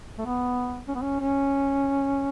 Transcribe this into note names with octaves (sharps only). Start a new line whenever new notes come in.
A3
B3
C#4
B3
C#4
C#4